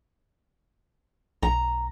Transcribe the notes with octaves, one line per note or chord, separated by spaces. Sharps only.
B1 A#5